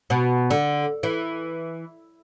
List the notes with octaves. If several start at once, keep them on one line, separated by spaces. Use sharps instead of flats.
B2
D3
E3